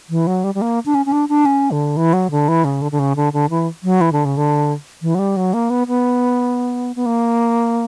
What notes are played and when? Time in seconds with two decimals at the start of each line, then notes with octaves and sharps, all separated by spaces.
0.10 E3
0.27 F#3
0.44 G3
0.55 G3
0.61 A#3
0.86 D4
0.95 C#4
1.06 C#4
1.12 D4
1.29 D4
1.45 C#4
1.71 D3
1.97 E3
2.13 F#3
2.31 D3
2.48 E3
2.64 C#3
2.82 D3
2.92 D3
2.99 C#3
3.16 D3
3.33 D3
3.50 E3
3.83 F#3
4.01 E3
4.12 D3
4.25 C#3
4.37 D3
5.02 E3
5.15 F#3
5.19 G3
5.36 F#3
5.54 A#3
5.70 B3
5.88 B3
6.96 B3
7.06 A#3